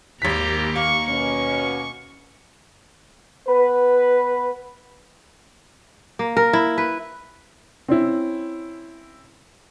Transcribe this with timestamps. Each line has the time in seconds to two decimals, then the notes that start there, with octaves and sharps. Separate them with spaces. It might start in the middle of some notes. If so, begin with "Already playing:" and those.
0.22 G#1 D#2 G4 A#5 B6
0.76 A#3 C#6
1.09 B2 C#4 C#6
3.47 B3 B4
6.19 A#3
6.37 A#4
6.53 E4
6.78 B4
7.88 C4 C#4 E4